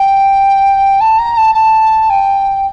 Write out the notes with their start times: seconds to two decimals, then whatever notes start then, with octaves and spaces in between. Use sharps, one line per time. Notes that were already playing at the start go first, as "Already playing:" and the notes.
Already playing: G5
1.00 A5
1.18 A#5
1.37 A5
1.54 A5
2.09 G5